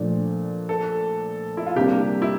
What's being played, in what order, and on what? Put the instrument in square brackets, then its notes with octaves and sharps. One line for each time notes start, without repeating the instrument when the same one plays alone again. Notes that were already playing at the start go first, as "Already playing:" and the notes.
Already playing: [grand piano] A#2 F3 A3 D4
[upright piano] A4
E4
F4
[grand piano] C3 G3 A#3 D4 [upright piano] G4
[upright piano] E4